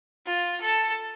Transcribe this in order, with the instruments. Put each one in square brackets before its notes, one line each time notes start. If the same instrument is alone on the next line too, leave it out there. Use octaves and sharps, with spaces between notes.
[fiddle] F4
A4